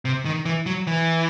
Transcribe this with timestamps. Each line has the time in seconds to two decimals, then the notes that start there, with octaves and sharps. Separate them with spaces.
0.05 C3
0.25 D#3
0.45 E3
0.66 F#3
0.87 E3